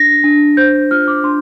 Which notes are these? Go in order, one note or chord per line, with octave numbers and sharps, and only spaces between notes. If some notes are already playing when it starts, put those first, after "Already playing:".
Already playing: D4 A#6
D4
C5 G6
F4 F6
D6
D4 C6